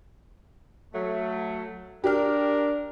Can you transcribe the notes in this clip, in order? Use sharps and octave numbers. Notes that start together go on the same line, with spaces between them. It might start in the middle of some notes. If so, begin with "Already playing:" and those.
F#3 A3
D4 G4 A#4 F6